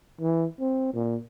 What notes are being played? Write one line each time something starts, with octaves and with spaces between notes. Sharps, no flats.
E3
C4
A#2